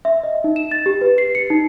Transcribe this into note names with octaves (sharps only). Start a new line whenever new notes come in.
E5
D#5
D#4
E7
A6
G4
B4
C7
C#7
D#4